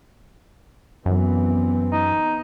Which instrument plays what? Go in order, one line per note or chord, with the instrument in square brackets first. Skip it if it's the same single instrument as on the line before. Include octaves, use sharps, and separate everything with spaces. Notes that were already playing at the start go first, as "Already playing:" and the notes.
[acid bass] F#2 [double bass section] E3 B3 C4
[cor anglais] D#4